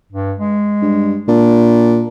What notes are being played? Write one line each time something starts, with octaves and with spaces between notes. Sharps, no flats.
G2
G#3
G2
A#2 D4